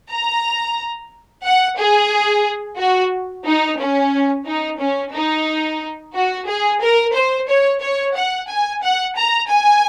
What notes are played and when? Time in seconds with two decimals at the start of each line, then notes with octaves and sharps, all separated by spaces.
0.10 A#5
1.44 F#5
1.77 G#4
2.78 F#4
3.46 D#4
3.79 C#4
4.46 D#4
4.80 C#4
5.13 D#4
6.14 F#4
6.47 G#4
6.81 A#4
7.14 C5
7.48 C#5
7.81 C#5
8.15 F#5
8.48 G#5
8.82 F#5
9.15 A#5
9.49 G#5